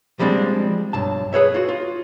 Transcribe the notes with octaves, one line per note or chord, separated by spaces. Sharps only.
F3 G3 G#3 C4 D4
B1 G2 A5
G#4 B4 C#5 E5
F4 F#4
F4